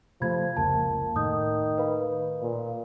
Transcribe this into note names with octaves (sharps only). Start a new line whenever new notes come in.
C3 F3 A3 B5 G#6
F1 C#2 A#3 A5
A2 D#3 D#6 G6
B4 F5 B5
A#2